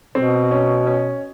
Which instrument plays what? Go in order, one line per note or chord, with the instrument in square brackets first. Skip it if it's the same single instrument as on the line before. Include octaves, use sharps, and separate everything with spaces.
[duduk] B2 [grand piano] C4
[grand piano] C#4
C#4